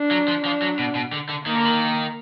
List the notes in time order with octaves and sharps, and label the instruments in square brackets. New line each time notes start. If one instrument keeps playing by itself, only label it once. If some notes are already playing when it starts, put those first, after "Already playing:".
Already playing: [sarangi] D4
[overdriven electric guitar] F#3
F3
[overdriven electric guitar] F3 [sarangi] D4
[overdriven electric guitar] F#3
B2
B2
D3
D3
[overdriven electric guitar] D#3 [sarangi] A#3
[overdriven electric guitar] D3
D#3